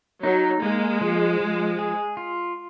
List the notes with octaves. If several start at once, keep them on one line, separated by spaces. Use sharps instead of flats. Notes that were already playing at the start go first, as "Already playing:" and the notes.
F#3 D#4
G#3 A#3
F3
F3
G#4
F4